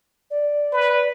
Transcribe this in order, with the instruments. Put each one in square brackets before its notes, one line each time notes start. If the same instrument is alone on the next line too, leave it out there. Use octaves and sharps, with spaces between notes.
[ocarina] D5
[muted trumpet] B4